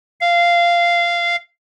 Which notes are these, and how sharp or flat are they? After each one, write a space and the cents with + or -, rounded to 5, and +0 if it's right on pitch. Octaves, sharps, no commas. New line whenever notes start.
F5 -15